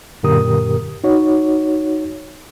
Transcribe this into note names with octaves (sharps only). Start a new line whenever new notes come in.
F#2 A#2 D3 G4 A#4 D#6
D#4 F#4 C#5